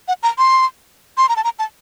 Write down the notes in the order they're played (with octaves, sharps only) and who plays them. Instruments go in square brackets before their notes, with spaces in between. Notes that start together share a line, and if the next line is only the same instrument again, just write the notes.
[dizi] F#5
A#5
C6
C6
A#5
A5
A#5
A5